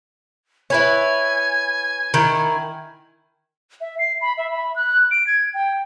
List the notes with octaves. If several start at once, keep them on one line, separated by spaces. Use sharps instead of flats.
E4 B4 C#5 G#5
D#3 E4
E5
C7
B5
E5
B5
F#6
D7
G#6
G5